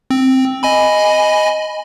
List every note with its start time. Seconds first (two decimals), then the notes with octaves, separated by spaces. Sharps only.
0.10 C4
0.63 D#5 G#5 B5